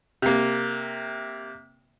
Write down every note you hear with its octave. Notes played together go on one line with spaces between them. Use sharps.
C3 A#3